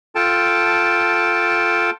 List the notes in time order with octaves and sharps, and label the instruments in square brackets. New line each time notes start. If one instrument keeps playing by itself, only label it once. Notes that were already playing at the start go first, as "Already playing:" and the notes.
[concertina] F4 A4 G5 A5